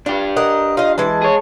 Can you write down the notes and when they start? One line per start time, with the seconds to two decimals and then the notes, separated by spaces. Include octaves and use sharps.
0.06 D4 F4 G4
0.37 A#4 D#5 F#5
0.77 D#4 F4 D#5
0.98 E3 G#3 A5
1.22 G#4 C#5